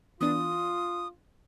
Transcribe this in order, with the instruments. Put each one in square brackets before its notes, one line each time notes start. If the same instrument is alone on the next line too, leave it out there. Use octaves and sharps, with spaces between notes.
[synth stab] E3 B3 D4 [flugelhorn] F4 [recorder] D#6